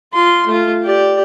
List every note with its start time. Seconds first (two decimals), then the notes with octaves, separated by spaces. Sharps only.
0.13 F4 C6
0.47 A3 F4
0.83 G4 D5